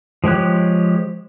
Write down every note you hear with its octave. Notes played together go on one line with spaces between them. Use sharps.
F3 G#3 G4 C#5 F#6